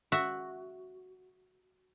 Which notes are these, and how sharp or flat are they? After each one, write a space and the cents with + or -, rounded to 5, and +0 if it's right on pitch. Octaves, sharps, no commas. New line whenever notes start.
F#4 +0 E5 +0